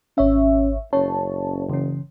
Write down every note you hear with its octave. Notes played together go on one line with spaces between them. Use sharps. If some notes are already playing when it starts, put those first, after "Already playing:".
G#1 C#4 C#5 E5
F#1 C#4 C#5 A5
C#3 E3 C#4